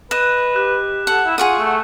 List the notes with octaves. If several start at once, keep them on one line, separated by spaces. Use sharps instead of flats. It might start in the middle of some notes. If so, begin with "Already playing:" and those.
B4 D#5 F#6 E7
G4 F#6 E7
A4 F#5
E4
F4 G#4 F#5 C#6 D#6
A3